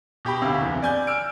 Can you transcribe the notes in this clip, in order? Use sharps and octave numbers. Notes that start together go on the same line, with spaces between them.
B2 G4 G5 B5
D2 C3 F5
F#1 E2
D5 G#5 G6
E6 F6 D7